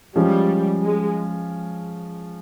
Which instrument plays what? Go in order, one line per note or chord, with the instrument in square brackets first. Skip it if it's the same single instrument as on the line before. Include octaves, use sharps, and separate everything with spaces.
[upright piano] F3 G#3 C#4 [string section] G3
[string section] G#3